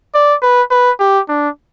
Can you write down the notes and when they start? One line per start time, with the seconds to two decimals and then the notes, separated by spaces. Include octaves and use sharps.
0.15 D5
0.42 B4
0.71 B4
1.00 G4
1.29 D4